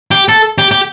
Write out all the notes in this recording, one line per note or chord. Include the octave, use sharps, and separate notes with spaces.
G4
A4
G4
G4